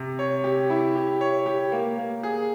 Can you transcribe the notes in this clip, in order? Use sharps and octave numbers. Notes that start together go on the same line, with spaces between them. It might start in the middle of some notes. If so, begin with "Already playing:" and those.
Already playing: C3
C#5
G4
E4
G4
C#5
G4
A#3
A#3
G#4